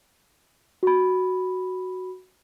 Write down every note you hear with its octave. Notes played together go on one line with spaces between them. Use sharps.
F#4 B5